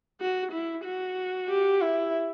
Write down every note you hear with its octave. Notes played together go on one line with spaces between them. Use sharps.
F#4
E4
F#4
G4
E4